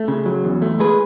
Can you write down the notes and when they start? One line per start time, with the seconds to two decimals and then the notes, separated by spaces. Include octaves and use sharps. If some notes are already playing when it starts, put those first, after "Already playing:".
Already playing: A3
0.08 C#3
0.26 F#3
0.44 E2
0.62 A3
0.80 G#3 G#4 B4